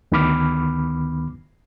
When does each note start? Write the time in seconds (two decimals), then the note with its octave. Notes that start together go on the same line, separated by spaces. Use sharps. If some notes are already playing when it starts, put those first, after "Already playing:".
0.12 D2 D#3 B3 B5 D6 F6